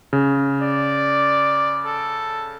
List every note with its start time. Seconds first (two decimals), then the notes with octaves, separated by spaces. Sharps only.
0.13 C#3
0.61 D5
1.85 A4